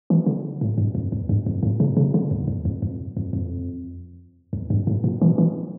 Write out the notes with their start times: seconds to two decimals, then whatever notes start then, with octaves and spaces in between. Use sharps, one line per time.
0.10 E3
0.26 D3
0.61 A2
0.78 G2
0.95 F2
1.12 E2
1.29 G2
1.46 F2
1.63 A2
1.80 C#3
1.97 C#3
2.14 D3
2.31 E2
2.48 E2
2.65 F2
2.82 F2
3.17 F2
3.33 F2
4.53 E2
4.70 G2
4.87 A2
5.04 A#2
5.22 E3
5.38 E3